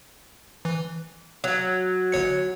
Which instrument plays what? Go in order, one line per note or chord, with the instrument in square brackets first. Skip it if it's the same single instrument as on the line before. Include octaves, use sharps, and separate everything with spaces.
[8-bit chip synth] E3
[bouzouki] F#3
[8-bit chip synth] G1 C#5 C#7